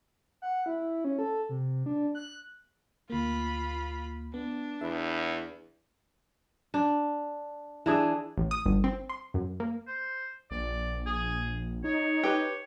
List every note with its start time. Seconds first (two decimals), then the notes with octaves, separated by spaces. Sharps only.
0.42 F#5
0.66 E4
1.05 C#4
1.19 A4
1.49 C3
1.86 D4
2.15 F#6
3.10 D2 A#3 F4 B5
4.34 B3 D4
4.81 E2 E5 B5
6.74 D4
7.86 E3 D4 G#4
8.38 A1
8.51 D#6
8.66 G1
8.84 C4
9.10 C6
9.34 F#2
9.60 A#3
9.87 C5
10.51 A#1 D5
11.06 G#4
11.84 D#4 C#5
12.23 G4 B4